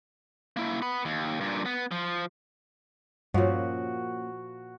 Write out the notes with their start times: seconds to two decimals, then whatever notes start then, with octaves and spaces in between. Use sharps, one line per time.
0.56 A#3 E4
0.82 B3 B5
1.05 D#2
1.40 G2 A#2
1.66 B3
1.91 F3
3.34 G2 A#2 F3 A#3 C#4 F#4